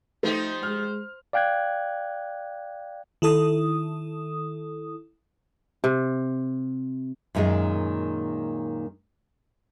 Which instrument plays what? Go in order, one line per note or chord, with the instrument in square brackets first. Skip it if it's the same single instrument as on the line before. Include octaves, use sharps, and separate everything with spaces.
[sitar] F3 D#4 G4 [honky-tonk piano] A3 [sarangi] C5
[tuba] G#3 [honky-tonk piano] F6
[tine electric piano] D5 F5 G5 F#6 G#6
[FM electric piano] D#3 E4 A4 D#6
[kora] C3
[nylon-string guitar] F#2 A#2 D#3 G3 G#3